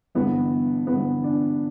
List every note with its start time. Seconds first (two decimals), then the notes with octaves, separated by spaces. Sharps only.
0.15 G1 G2 E3 B3
0.87 G1 G2 E3 B3
1.24 D4